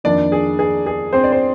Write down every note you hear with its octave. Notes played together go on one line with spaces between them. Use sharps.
F2 D#3 A#3 D4 D5
G#4
G#4
G#4
C4 C5
D5
C5